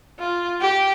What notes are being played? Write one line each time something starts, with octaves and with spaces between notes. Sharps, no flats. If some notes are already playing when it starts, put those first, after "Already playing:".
F4
G4